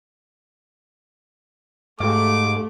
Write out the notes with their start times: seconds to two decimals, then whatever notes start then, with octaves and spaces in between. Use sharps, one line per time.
2.00 G#2 A3 G4 F5 D6